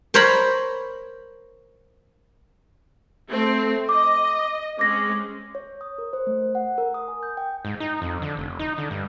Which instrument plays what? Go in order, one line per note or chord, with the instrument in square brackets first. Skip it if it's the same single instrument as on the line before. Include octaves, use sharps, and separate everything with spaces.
[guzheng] A#4 C5 C#5 A#5 B5
[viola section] A3 C4
[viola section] D#5 [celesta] D6
[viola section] G#3 C4 C#4 [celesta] D6 A#6
[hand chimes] C#5
D#6
A#4
C5
A3
F#5
A#4
D#6
G#5
G6
G5
[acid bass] G#2
D#4
F2
D3
F1
D#4
D3
G2